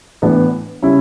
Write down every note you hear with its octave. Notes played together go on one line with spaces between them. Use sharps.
A2 E3 B3 D4
C#3 G3 C#4 E4